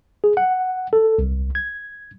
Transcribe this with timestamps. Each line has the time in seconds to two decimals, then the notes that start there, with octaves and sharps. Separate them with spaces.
0.24 G#4
0.37 F#5
0.93 A4
1.18 C2
1.55 G#6